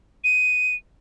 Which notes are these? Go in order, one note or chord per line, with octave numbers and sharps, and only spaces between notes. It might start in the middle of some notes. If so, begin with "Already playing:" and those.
D#7